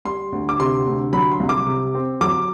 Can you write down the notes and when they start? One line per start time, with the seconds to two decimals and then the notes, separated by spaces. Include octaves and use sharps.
0.05 G3 C6
0.32 D2
0.49 D6
0.60 C3 C6
0.87 D2
1.13 F#3 B5
1.31 C6
1.40 C2
1.49 D6
1.67 C3
1.95 C4
2.21 F#3 D6